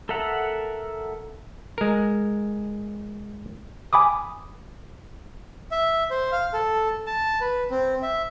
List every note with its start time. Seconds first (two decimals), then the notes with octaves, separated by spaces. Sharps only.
0.09 A4 A#4 E5 F#5 A#5
1.78 G#3 A#4
3.93 G#5 B5 D6 D#6
5.71 E5
6.11 C5
6.32 F5
6.54 A4
7.07 A5
7.41 B4
7.70 C4
8.02 E5